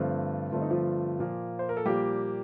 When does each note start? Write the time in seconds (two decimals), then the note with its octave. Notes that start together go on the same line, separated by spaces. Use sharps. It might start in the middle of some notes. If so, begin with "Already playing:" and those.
Already playing: G2 D3 F3 A3 C4 F4
0.52 G2 D3 A3 C4 F4
0.62 D#4
0.70 F3 F4
1.19 A#2 F3 A#3
1.59 C5
1.69 A#4
1.77 A4
1.85 A#2 F3 G3 A#3 G4